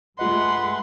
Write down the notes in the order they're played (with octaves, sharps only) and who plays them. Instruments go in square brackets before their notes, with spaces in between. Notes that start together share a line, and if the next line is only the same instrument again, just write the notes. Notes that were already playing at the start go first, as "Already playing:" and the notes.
[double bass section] G2 G#3 A3 [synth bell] F4 D#5 [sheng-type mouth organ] B4 F#5 [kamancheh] C6